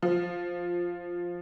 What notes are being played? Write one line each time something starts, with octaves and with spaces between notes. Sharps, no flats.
F3